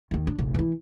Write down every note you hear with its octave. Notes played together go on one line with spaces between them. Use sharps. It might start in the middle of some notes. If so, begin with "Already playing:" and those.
D#2 D#3
D4
F1 A#1
E3 E4